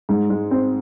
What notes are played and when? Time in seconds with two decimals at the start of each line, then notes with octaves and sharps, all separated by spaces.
0.09 G#2
0.30 G#3
0.51 C4